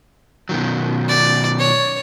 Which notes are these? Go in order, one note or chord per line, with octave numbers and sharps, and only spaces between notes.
B2 D#3 F#3
D5
C#5